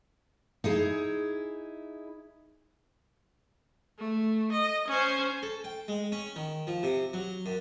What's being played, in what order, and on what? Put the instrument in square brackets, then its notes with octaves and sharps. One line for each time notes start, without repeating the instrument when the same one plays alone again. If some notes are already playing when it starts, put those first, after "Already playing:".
[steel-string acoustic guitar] D#4 E4 G#4
[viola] A3
D#5
C#4 C5
[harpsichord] A4
G5
G#3
C#4
D#3
F3
C3
F#3
F#2